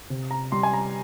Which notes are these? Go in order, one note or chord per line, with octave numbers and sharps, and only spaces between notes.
C3
A#5
G3 C6
G#5
A#5